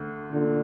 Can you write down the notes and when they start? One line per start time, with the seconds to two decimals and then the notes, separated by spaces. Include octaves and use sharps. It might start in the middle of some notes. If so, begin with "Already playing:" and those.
Already playing: D2 D3
0.31 A#2 D3